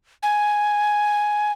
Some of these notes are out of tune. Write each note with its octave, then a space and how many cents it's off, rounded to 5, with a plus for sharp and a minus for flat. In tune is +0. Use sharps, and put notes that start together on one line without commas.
G#5 +5